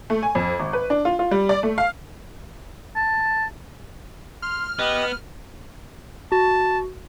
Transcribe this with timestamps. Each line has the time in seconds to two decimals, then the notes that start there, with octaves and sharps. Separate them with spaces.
0.10 A3
0.23 G#5
0.35 F2
0.60 G#1
0.73 B4
0.90 D4
1.05 F4
1.19 F4
1.31 G3
1.49 D5
1.63 A3
1.78 F5
2.95 A5
4.42 C6 F6
4.79 B3 G4 D#5
6.32 F#4 A5